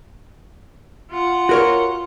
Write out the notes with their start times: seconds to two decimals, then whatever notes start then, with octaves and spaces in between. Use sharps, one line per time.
1.11 F4 F#5
1.49 F#4 A#4 C#5